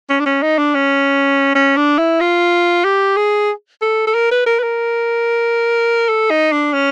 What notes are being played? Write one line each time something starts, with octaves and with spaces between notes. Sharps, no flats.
C#4
D4
C#4
D#4
D4
C#4
C#4
D4
E4
F4
G4
G#4
A4
A4
A#4
B4
A#4
B4
A#4
A4
D#4
D4
C#4